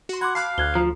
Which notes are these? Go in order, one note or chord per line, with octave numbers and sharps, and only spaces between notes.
F#4 C6
F#5 B5 C6 D6 G#6
F5 A5 B5 D6 F#6 C7
D2 F#6 G#6 G7
F3 A#5